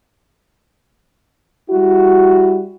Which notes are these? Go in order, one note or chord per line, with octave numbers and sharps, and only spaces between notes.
G3 E4 F#4